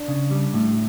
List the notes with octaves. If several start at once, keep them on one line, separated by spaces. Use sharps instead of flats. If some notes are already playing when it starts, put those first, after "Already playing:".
Already playing: D4
C#3
G3
A2